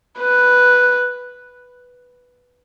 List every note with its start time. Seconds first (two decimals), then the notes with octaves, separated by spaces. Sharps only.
0.19 B4